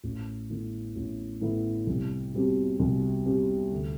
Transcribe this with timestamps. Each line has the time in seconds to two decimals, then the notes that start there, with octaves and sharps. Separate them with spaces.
0.04 A1
0.49 A2 E3 B3 E4
0.96 A1
1.41 A2 E3 B3 E4
1.87 C2
2.34 B2 G3 C4 G4
2.80 C2
3.26 B2 G3 C4 G4
3.71 D2